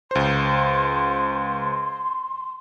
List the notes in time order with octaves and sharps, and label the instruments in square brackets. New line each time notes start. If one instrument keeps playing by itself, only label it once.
[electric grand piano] C#2 C5 [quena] C6